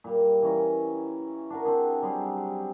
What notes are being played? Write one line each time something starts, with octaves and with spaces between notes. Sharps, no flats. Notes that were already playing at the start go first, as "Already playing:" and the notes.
A#2 G3
E3 C#4 A#4
D4 F#4 A#4
C4 D4 G#4
F#3 G3 C4 G#4